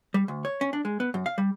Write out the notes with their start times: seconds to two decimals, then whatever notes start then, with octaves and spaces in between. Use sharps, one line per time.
0.14 G3
0.28 D2
0.45 C#5
0.61 C#4
0.73 D4
0.85 G#3
1.00 B3
1.14 F#2
1.26 F5
1.38 G3